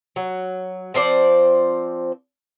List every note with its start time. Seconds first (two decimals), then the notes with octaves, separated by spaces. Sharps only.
0.16 F#3
0.94 F3 C4 C5 D5